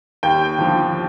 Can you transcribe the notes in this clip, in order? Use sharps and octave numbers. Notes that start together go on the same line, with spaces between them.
D#2 G5
D3 F3